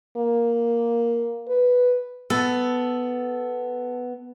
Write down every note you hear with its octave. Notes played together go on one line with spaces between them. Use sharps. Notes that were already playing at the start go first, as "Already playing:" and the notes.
A#3
B4
B3 A4